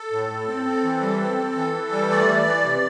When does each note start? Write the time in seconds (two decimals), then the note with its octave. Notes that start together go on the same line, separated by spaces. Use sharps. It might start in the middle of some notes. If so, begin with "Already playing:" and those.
Already playing: A4
0.12 A2
0.29 A2
0.48 C4
0.66 C4
0.84 E3
1.02 G3
1.20 C4
1.38 C4
1.56 E3
1.74 E3
1.92 G3
2.10 A3 D5
2.28 E3
2.46 E3
2.65 C3